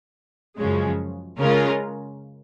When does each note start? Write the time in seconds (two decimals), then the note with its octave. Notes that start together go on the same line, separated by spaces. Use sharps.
0.59 F#2 C#3 F3 G#3 C#4
1.40 C#3 G#3 C#4 F4 A#4